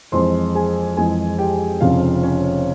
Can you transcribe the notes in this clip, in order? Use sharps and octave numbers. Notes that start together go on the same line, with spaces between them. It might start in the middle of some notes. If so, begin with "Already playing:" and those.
F2 E3 G#3 C5 C6
G#4 G#5
F2 E3 G#3 G#4 G#5
G4 G5
F1 F2 C#3 F3 F4 F5
C#4 C#5